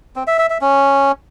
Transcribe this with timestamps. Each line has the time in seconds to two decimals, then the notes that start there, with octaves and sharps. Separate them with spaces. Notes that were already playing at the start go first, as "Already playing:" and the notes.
0.16 C4
0.27 E5
0.39 E5
0.50 E5
0.61 C#4